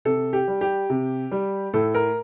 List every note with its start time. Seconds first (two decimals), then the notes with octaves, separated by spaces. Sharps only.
0.05 C3 A4
0.33 G4
0.48 G3
0.61 G4
0.90 C3
1.31 G3
1.74 A2 A4
1.94 A#4